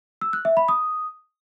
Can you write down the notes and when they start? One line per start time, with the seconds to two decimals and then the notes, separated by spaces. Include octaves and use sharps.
0.21 E6
0.33 F#6
0.45 E5
0.57 B5
0.68 D#6